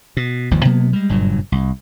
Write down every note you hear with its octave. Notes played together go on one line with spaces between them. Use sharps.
B2
G1 D#2 F3
B2 F#3 A#3 B3
G3 G#3
F#1 G2 A#2 F#3
C2